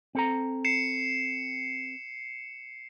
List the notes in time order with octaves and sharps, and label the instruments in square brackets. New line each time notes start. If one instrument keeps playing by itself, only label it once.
[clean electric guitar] C4 A4 A#5
[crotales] C7 C#7 E7